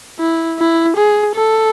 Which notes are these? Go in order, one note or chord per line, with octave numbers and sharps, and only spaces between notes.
E4
E4
G#4
A4